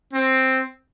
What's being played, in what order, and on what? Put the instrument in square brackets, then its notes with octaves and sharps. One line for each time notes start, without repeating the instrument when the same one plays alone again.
[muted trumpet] C4